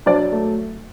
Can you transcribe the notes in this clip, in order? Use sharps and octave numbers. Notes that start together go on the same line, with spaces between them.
F#3 D4 D5
A3